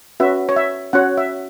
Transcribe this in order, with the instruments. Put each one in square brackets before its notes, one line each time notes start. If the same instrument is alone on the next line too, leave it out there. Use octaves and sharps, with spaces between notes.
[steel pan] C#4 F#4 B4 E5
C#5
E5
C#4 F#4 C#5 F#5
E5